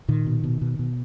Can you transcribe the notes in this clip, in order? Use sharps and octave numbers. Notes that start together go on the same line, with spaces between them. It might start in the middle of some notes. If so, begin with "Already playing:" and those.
A#2 D#3
B2
B2
B2
B2